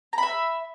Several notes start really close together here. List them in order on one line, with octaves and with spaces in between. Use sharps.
A#5 B5 E5